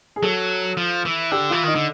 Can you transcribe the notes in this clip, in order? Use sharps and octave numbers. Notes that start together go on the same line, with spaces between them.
G#4
F#3 A4
F3
E3
D3 G4
E3 F4
D#3 D#4
D3